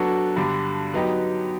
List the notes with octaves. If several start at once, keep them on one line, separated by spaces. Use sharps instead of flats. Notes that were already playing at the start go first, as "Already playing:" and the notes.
Already playing: F#3 B3 D4 F#4 A4
G2 D3 G3
F#3 B3 D#4 G4